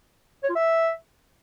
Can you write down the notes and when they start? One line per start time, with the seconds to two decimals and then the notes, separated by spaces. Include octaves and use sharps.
0.43 C#5
0.49 F4
0.55 E5